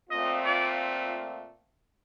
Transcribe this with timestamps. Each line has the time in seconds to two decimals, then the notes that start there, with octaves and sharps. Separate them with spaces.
0.10 A#2 A3 C4 F4 D#5
0.45 D5